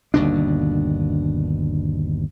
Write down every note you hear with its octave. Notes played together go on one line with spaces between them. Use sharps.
G1 D#2 B2 D4